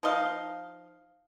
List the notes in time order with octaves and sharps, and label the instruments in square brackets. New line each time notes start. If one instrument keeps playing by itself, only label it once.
[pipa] F3 D#4 D#5 F5